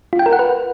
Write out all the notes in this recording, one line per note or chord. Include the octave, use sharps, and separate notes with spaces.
F4
G5
A#4
F#5
B4